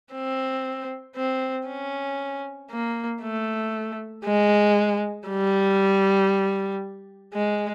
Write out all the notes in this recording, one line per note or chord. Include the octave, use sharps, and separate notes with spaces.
C4
C4
C#4
A#3
A3
G#3
G3
G#3